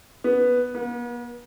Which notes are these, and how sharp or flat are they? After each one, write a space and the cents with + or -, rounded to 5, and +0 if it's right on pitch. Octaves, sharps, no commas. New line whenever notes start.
B3 +0
B3 -45